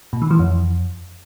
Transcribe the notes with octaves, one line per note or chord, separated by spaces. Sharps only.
A#2
D#3
E3
F2